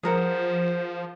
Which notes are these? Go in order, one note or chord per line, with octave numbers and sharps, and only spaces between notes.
F3 G#4 A#4 C5 F#5